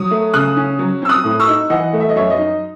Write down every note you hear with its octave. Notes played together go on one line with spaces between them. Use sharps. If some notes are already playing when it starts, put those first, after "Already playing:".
Already playing: F#3 D#6
A3
C#3 D#6 F#6
C#4
F#3
C4 E6
D#6 F#6
A2
C#6 E6
D#4
E3 D#5 F#5
A3
E5
D#5
F#2 C#5 E5
D#5
D#4